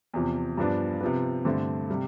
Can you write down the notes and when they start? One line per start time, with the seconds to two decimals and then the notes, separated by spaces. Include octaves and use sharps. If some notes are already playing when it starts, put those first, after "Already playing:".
0.14 E2 C3 F3
0.57 G2 F3 B3 D4
1.01 C3 F3 B3
1.45 G2 D3 A3 C4
1.90 C3 G3